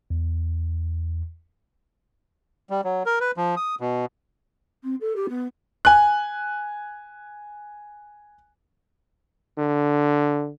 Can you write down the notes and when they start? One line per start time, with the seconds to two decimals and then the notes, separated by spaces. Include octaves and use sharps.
0.10 E2
2.70 G3
2.84 F#3
3.06 A#4
3.21 B4
3.37 F3
3.57 D#6
3.81 B2
4.83 C4
5.01 A4
5.16 G4
5.29 B3
5.85 G#5 F#6
9.58 D3